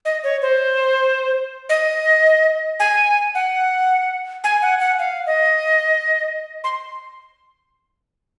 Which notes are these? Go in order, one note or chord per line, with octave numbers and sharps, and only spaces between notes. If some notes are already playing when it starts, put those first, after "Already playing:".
D#5
C#5
C5
D#5
G#5
F#5
G#5
F#5
F#5
F5
D#5
C6